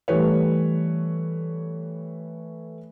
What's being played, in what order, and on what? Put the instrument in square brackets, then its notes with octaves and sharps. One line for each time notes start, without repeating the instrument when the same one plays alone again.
[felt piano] E3 G3 A3 B4 C#5